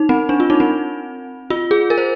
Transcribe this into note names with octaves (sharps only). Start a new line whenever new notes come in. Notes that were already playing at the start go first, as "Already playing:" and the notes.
Already playing: D#4
C4
D4
F4
D#4
C4
F4
G#4
A#4
C5